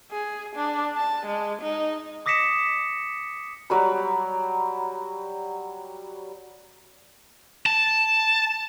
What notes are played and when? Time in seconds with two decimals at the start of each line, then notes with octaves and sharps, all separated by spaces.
0.12 G#4
0.56 D4
0.97 A5
1.26 G#3
1.62 D#4
2.26 D6 D#6 A#6 B6 C#7 E7
3.70 F#3 G3 B5
7.66 A5